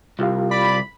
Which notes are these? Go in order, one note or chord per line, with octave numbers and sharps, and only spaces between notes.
C2 F4 G4 F5
D5 B5